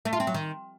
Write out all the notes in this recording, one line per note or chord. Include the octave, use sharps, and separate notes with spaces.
A3
F4
C4
F#3
D#3